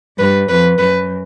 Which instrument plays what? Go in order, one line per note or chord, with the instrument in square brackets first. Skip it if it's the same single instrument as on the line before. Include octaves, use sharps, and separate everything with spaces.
[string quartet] G2 [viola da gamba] B4
[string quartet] F2 [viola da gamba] B4
[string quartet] F#2 [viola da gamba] B4